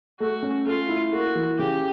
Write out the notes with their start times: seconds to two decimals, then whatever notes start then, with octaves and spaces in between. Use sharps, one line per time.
0.20 A3 F#4
0.43 C#4
0.66 A3 F4
0.89 E4
1.12 A#3 F#4
1.35 E3
1.58 C#3 G4